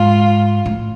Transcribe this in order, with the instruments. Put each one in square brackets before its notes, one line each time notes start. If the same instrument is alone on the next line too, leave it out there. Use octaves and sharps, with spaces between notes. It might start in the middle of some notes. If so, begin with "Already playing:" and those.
Already playing: [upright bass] G#2 [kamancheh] F4
[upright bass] A2